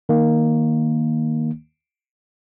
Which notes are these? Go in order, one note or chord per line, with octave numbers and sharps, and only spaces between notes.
D#3 A#3